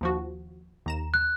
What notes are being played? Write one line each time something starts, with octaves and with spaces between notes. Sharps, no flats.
D#2 F3 F#4
D#2 A#5 E7
F#6